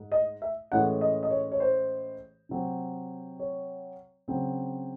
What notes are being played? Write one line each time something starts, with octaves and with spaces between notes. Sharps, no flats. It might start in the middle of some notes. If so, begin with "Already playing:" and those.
Already playing: G#2
D#5
E5
A2 E3 G#3 C#4 F#5
D#5
D#5
C#5
C#5
C5
C3 F#3 C4
C#5
C#3 F#3 C4